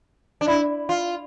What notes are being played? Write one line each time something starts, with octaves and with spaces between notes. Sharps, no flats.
D4
E4
F4